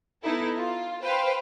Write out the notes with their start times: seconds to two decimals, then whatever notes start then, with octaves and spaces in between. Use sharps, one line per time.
0.23 B3 D#4 E4 A4
0.57 F4
1.03 B4 C5 F5 G5